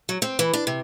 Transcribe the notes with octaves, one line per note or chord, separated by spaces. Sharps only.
F#3
C4
E3
D4
C3